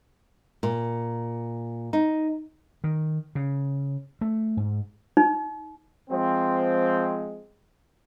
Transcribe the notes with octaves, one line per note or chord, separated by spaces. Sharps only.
A#2
D#4
D#3
C#3
A3
G#2
D#4
F3 G#3 C4